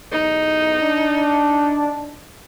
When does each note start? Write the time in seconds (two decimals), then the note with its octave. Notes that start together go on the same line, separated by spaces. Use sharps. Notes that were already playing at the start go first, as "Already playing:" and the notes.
0.12 B1 E2 D#4
0.82 D4